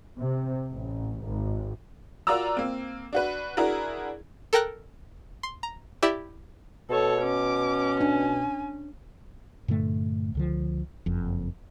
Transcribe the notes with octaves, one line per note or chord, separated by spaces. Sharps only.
C3
A1
G#1
F4 F#4 A#4 D5 A#5 E6
A#3 C4
D4 F#4 B4
D4 E4 F#4 G#4 A#4
A4 A#4 G5 A#5 F#6
C6
A#5
E4 G4 D5 E5
B2 A4 C#5
C#4 D6
D4 G#5
G2 A#2 D3 A3
C#2 D3 F3
F#1 F2